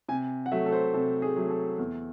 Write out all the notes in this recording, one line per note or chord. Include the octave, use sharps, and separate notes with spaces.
C3 G#5
F#5
F#3 A3 E5
A4
C5
C3 A4
G#4
F#3 A3
A4
E2